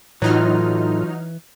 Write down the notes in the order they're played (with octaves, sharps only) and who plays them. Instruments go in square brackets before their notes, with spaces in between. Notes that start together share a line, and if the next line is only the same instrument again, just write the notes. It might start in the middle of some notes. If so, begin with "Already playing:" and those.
[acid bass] A2 [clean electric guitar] E3 [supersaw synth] F#3 D#4 F6 [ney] F4